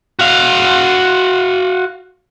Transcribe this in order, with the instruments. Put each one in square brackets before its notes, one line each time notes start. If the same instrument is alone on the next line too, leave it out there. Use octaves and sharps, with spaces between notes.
[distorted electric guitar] F#4 F5